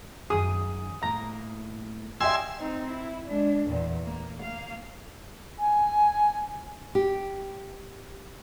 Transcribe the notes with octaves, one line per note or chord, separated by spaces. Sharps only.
F#2 D#3 G#4 D#6
A2 A#3 A#5
D4 G4 D#5 E5 G5 G#5 C6 E6
C4 D#4
E4
G#3 D4
E2 A#2
A#3
A#3 F5
G#5
G4